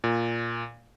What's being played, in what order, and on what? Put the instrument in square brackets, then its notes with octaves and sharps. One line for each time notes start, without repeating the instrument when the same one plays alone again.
[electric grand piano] A#2